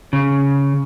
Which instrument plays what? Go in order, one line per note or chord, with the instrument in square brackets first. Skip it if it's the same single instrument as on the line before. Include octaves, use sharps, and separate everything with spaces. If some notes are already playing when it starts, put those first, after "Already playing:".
[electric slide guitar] C#3